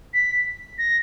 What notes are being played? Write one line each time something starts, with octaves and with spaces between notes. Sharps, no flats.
B6
A#6